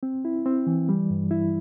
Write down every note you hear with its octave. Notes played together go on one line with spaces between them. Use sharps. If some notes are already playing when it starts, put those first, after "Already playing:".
C4
E4
C4
E3
G3
G2
E4